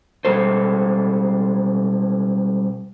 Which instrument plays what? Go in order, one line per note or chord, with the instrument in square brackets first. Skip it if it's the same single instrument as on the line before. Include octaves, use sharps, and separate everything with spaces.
[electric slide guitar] B2 G3 G#3 A4 C5